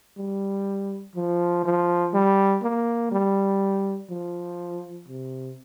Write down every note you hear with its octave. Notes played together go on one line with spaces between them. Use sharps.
G3
F3
F3
G3
A#3
G3
F3
C3